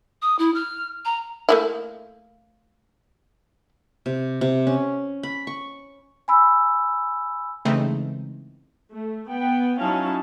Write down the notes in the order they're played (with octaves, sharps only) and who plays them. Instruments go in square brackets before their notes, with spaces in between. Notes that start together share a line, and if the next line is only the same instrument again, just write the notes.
[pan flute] D#6
E4
F6
A#5
[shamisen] A3 A#3 E4
[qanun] C3
C3
C#4
B5
C#6
[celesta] G#5 B5 E6
[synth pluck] C#3 E3 G#3 A3 C4 D#4
[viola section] A3
B3 G5
F#3 C#4 D#4 E4 F5 A5